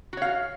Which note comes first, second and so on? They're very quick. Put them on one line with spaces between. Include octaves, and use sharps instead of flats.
F#4 C#5 F5